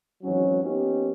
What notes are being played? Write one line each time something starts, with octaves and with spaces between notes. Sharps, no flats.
G#1 G#2 E3 F#3 C#4
F3 A#3 B3 C#4 D#4 G4